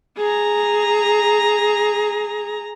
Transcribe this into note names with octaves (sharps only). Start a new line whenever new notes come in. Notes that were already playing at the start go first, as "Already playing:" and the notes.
G#4 A#5